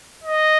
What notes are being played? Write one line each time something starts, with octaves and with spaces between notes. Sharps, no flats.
D#5